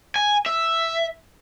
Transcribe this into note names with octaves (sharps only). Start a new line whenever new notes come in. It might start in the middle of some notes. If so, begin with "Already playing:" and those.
G#5
E5